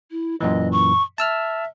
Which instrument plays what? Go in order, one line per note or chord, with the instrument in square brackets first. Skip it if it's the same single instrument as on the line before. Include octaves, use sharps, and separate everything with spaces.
[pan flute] E4
[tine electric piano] F#2 A#2 E3 [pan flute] D#5
[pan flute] C#6
[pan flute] E5 [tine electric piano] A5 E6 F6